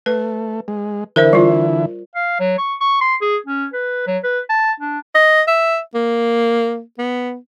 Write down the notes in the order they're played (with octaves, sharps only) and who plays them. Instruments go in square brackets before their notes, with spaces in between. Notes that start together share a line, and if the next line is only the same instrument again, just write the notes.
[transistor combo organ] A3 [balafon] B4
[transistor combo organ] G#3
[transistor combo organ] D3 E3 E4 [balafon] A#4 C5 E5
[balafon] G3 F4
[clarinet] F5
F#3
C#6
C#6
C6
G#4
C#4
B4
F#3
B4
A5
D4
[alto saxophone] D#5
E5
A#3
B3